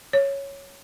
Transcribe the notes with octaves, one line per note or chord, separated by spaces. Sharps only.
C#5